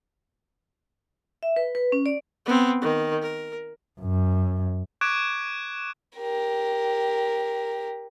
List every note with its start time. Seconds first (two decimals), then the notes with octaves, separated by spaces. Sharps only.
1.43 E5
1.56 B4
1.75 B4
1.92 C#4
2.06 D5
2.46 B3 C4
2.82 D#3
3.22 A#4
4.01 F#2
5.01 C#6 D6 F#6 G#6 D7 E7
6.17 G4 A#4